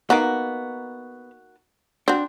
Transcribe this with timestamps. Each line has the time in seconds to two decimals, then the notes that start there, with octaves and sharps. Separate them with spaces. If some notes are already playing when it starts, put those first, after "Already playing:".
0.10 A#3 B3 D#4 F#4 F#5
2.08 C4 D4 F#4